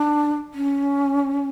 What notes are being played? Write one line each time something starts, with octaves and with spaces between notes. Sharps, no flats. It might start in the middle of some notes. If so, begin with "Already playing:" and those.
Already playing: D4
C#4